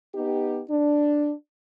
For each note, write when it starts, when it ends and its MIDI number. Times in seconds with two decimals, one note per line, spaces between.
0.15 0.61 59
0.15 0.61 63
0.15 0.61 67
0.69 1.33 62